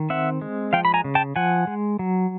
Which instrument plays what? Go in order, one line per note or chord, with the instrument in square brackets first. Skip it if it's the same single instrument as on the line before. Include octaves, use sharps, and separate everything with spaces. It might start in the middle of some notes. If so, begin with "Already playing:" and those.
Already playing: [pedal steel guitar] D#3
C4 E5 F#5
G#3
F3 F5 G5
B5
G#5 A#5
C#3
G5 A5
F3 F#5 G#5
G#3
F#3